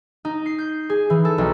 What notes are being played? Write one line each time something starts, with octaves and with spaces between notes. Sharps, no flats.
D#4
C7
G6
G#4
E3
A4
B1